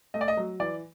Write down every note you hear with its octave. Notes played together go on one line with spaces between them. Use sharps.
A3 D#5
D5
D#5
F#3
E3 D5